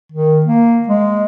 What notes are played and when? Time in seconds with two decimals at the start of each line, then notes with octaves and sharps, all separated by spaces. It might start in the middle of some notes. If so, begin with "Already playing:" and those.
0.12 D#3
0.46 A#3
0.88 G#3